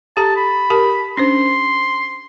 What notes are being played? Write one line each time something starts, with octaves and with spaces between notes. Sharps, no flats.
G4 A4 A5 A#5
B5
G4 A#4 A5
C#4 D4 C5 C6